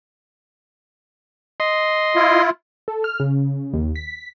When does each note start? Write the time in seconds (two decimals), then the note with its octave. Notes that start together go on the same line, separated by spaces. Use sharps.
1.60 D#5 C6
2.16 E4 F4
2.88 A4
3.04 F6
3.20 C#3
3.74 D#2
3.96 B6